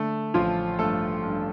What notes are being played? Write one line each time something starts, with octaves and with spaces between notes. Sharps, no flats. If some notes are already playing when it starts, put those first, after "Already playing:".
Already playing: D3 A3
A1 F3 F4
G2 A3 A4
G2